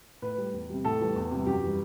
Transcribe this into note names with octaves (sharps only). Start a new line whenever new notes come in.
A2 B4
G3
E2
C3 G3
A2 A4
E3 G3
E2
C3 G3
F#2 G4
E3 G3